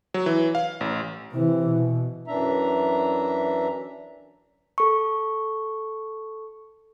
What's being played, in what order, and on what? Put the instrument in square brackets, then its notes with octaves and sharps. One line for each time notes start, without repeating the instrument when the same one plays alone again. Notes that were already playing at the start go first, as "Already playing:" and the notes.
[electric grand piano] F#3
E3
F5
A1
[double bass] C3 E3
B2
[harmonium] F#2 E3 D4 E5 A#5
[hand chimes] A4 C#6